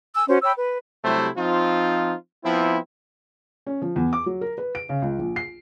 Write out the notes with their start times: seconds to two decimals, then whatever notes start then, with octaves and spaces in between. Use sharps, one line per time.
0.15 G#5 E6
0.28 C#4 F#4 C5
0.42 C#5 G5 B5 E6
0.56 B4
1.04 C3 F#3 G3 A3 E4 C5
1.37 F3 C4 D#4 F4
2.45 F3 B3 C4 E4
3.67 C#4
3.82 F3
3.96 E2
4.13 D6
4.26 F#3
4.41 A#4
4.58 B4
4.75 D7
4.89 C#3
5.02 C#2
5.19 A#1
5.36 C7